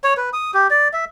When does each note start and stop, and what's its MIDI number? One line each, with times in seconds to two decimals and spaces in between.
0.04 0.14 73
0.17 0.30 71
0.33 0.51 87
0.54 0.67 67
0.70 0.88 74
0.93 1.05 76